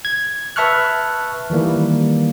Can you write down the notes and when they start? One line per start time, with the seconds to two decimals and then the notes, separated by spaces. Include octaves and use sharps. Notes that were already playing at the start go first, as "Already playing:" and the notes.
0.05 G#6
0.56 B4 E5 A5 C#6 F6 F#6
1.50 D#3 E3 G3 A#3